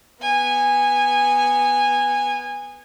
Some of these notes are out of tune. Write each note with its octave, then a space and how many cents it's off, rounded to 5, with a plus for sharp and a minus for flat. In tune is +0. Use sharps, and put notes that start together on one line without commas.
B3 +0 G#5 -15